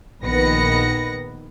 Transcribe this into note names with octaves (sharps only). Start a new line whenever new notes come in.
A#1 D#3 B3 B4 A#6 C#7